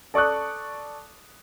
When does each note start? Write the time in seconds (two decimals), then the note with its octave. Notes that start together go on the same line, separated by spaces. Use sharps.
0.14 A4 D5 C#6 D#6 F#6